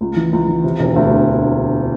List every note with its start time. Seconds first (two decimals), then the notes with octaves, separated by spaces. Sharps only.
0.01 C#2
0.16 E3
0.33 C#2
0.48 E3
0.64 C3
0.80 E1
0.96 D2